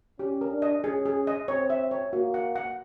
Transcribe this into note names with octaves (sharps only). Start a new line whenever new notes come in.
C#4 G4
A#4
D4
D#5
C#4 G#4
G#4
D#5
C4 C#5
E5
C#5
A#3 F#4
F#5
F#5